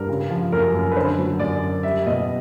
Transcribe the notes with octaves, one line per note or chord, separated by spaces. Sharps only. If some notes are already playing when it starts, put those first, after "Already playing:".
Already playing: G2 A#4
C#3
F3
F#2 A#4
F#2
B4
D3 C5
F#3
F#2 D5
F#2
G3 E5
B2 D#5